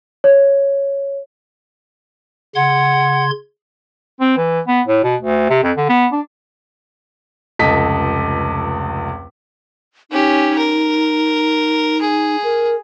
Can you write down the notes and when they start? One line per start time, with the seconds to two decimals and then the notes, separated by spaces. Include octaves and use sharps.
0.24 C#5
2.55 C#3 F#5 C6 G#6
4.21 C4
4.38 E3
4.67 B3
4.87 A2
5.04 B2
5.21 D2
5.50 C3
5.64 F2
5.77 D3
5.89 B3
6.13 D4
7.59 F1 C#2 A4 D#5 B6
10.11 C#4 D#4 G4
10.58 A#4
12.01 G#4
12.44 A#4